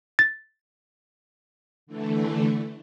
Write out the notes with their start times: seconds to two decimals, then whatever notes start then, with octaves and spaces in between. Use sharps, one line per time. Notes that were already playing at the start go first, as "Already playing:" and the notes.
0.19 A6
1.87 D3 E3 A3